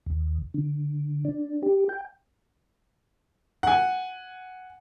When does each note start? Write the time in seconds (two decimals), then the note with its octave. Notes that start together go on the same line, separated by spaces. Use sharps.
0.06 D#2
0.54 D3
1.25 D4
1.63 G4
1.89 G5
3.63 F#5 G#5